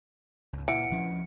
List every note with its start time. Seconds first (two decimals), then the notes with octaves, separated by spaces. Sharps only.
0.53 C#2 G#2
0.68 A#2 E3 F#5 C#7 D7
0.91 D2 F3 C#4